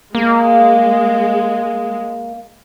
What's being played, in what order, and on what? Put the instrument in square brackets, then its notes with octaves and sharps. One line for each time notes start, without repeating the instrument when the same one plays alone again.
[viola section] G#3 [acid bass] A#3